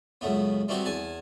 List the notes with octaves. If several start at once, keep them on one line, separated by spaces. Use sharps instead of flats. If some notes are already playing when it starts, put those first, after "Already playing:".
C#2 F#2 A3 B3
G3 A3 B3 C4 F#4
E2 G#5 A5